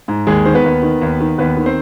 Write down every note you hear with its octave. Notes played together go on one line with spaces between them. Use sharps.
G#2
D#2 G#3 G#4
D#3 C5
B3 B4
D#2
D#3
D#2
D#3
D#2 B3 B4
D#3
C4 C5